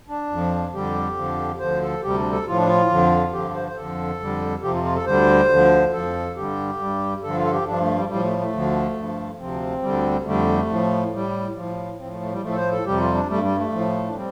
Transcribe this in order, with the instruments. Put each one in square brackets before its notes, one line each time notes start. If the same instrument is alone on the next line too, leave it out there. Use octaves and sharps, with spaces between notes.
[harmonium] D4
F2 F3
F2 D3 G3 G4
F2 D3 F3
D2 D3 F3 C5
A4
D2 C3 G3 G4
D4
A4
A2 F3 F4
D4
F4
F2 D3 F3
G2 D3 F3 G4
C5
C5
F2 D3 F3 A4
F2 D3 G3
F2 C3 F3 G4
F4
F4
A4
D2 D3 G3 C5
D2 D3 F3
F2 F3 A4
G2 D3 G3 G4
G2 G3
G2 D3 F3 A4
F4
A4
G4
G2 F3 D4
A3
G3
A2 F3 G3
A3
A3
D2 D3 F3
G2 F3
D2 C3 F3 C4
D2 D3 G3
F2 D3 G3 A3
A2 F3
A2 G3
A2 F3
A2 F3 C4
A3
A3
G3
A2 F3 A3
A4
C5
A4
F2 C3 G3 G4
F4
D4
G2 G3 A3
G3
A3
A2 F3
D4
G3 C4